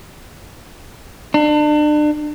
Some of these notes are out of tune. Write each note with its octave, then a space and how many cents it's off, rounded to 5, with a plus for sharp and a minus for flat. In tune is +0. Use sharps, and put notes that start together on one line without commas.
D4 +35